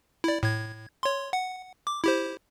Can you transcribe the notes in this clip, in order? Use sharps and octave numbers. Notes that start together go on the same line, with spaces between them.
E4 D5
A2 G#6
C#5 C6
F#5
D6
E4 G4 C5